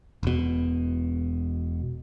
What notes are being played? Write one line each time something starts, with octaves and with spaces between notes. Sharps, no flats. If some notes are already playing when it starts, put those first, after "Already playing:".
E1 B2